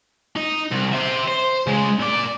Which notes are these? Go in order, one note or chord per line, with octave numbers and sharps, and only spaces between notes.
D#4 D#5
C2
C5 E5
C5
C#3 G#3
A#2 D5